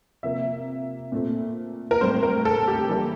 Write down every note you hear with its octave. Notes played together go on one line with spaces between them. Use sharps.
C3 F3 A#3 E5
A#2 A3 C4
A#4
A2 G3 C4 C5
A#4
A4
G4
E3 G3 A#3